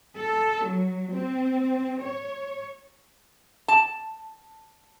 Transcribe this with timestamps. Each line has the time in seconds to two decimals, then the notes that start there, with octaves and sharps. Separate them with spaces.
0.17 A4
0.66 F#3
1.10 C4
2.01 C#5
3.68 A5